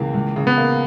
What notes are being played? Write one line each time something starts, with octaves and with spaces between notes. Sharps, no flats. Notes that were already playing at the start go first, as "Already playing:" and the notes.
Already playing: C#2 C#3 E3 A#3
C#2
C#3
B3
A#3